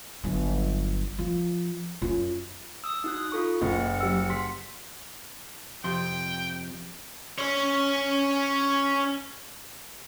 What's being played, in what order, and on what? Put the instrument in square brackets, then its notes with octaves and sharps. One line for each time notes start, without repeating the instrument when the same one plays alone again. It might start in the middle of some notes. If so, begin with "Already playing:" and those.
[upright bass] G1 F#3
F3
F#2 F4
[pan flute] D#6 [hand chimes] E6
[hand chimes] D#4 F#4 F#6
F4 A4 C#6
[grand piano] F#1 [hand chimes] A#3 C#4 D#5 [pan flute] F#5
[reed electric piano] F#3 G4 E6
[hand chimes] C6 B6
[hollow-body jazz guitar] F2 C3 C6 [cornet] G5
[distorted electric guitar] C#4 C#5